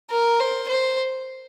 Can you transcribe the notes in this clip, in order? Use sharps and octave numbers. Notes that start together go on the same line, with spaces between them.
A#4
C5
C5